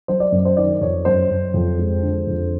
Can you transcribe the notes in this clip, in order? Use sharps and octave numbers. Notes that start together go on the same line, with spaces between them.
F#3 C5
D5
F#2
C5
D#3 D5
F2 C#5
F#2 C5
F#2
F2
G#3
D3
F2